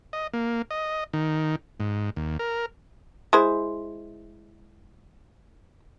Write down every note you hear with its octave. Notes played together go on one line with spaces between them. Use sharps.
D#5
A#3
D#5
D#3
G#2
D#2
A#4
G#3 E4 C5